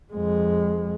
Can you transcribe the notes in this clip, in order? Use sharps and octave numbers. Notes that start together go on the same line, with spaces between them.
F2 G#3